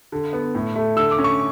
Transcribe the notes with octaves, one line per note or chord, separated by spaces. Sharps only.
D3
B3
A2
A3
D3 E6
D6
C#4
C#6